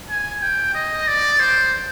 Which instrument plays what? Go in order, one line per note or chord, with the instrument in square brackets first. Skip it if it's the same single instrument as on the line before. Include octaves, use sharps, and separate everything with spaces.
[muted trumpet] G#5
G5
D#5
D5
C5